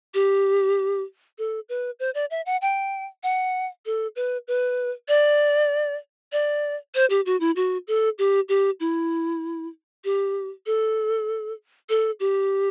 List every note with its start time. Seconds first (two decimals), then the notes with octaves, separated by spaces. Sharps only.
0.14 G4
1.38 A4
1.69 B4
2.00 C5
2.15 D5
2.31 E5
2.46 F#5
2.62 G5
3.23 F#5
3.86 A4
4.16 B4
4.48 B4
5.08 D5
6.32 D5
6.95 C5
7.10 G4
7.26 F#4
7.40 E4
7.56 F#4
7.88 A4
8.19 G4
8.49 G4
8.80 E4
10.04 G4
10.66 A4
11.89 A4
12.20 G4